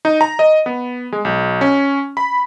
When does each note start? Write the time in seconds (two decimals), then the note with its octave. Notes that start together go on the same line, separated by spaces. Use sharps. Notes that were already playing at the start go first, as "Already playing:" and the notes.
0.05 D#4
0.21 A#5
0.39 D#5
0.66 B3
1.12 G#3
1.25 B1
1.61 C#4
2.17 B5